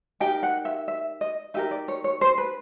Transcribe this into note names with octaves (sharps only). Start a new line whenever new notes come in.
D#4 G4 A#4 G5
F#5
E5
E5
D#5
D#4 G4 A#4 E5
D5
C#5
C#5
C5
B4